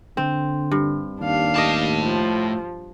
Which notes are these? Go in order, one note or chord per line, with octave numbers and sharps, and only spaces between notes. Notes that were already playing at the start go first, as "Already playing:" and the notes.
D3 C4
G2
D#2 D4 F5
A2 D5 D#5 A5
F3